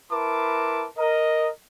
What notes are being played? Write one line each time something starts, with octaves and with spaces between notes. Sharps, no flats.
E4 A#4 B4 A5 C6 D6
A#4 D#5